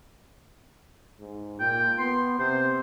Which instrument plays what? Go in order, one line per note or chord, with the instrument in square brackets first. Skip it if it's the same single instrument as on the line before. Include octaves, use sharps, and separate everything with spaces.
[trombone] G#2
[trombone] A#2 [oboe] G5
[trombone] B3 [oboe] C6
[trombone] C3 [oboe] C5